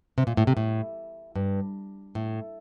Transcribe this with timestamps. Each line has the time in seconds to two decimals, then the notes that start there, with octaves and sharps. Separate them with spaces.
0.18 C3
0.27 A#2
0.37 A2
0.47 C3
0.57 A2
1.35 G2
2.15 A2